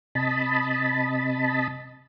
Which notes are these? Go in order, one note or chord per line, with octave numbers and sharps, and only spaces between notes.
C3 D#5 A5 B5